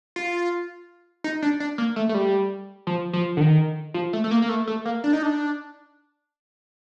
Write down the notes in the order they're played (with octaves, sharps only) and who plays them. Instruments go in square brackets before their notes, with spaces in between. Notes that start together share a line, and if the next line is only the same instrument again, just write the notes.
[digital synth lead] F4
D#4
D4
D4
A#3
A3
A3
G3
F3
F3
D3
D#3
F3
A3
A3
A#3
A#3
A3
A3
A#3
D4
D#4
D4